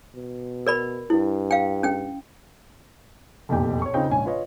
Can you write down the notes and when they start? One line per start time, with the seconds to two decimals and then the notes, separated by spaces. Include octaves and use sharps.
0.15 B2
0.67 A#4 D5 B5
1.10 G2 E4
1.51 F5 G5
1.83 C#4 G5
3.49 F1 B1 E2 A#2 G4 G5
3.82 C#5 C#6
3.94 C#3 C4 D#4 F4 G5
4.09 A#1 G#2 C#4 G#5
4.25 F4 B4 C#5 D#5